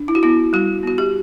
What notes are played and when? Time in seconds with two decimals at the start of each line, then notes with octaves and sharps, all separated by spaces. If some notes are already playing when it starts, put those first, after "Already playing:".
Already playing: D4
0.08 E4
0.15 F#4
0.23 B3 E4
0.53 G3 F#4
0.83 B3 F#4
0.98 G4